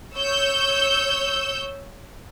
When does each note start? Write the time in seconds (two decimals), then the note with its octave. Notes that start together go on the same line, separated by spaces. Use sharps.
0.15 C#5 E6 G6